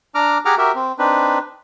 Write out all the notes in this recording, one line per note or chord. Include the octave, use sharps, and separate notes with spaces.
D4 A#5 D6 F6
G4 G#4 F#5 A#5 D6 F6
F#4 G4 A#4 E5
C4
C4 D4 D#4 B4